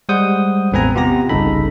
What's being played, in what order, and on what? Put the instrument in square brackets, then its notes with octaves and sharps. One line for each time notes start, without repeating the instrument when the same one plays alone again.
[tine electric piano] G3 G#3 C5 F#5 D#6 G6
A1 E2 C4 B4 G#5 A#5
C3 B3 F4 G4 A#5 A#6
G1 C2 C#3 D#4 A4 B5